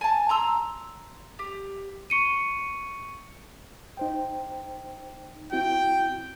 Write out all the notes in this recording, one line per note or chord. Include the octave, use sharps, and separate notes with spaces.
G#5 A5
A#5 C6 E6
G4
C#6 C#7 D#7
D#4 C5 G5
C4 E4 F#4 G5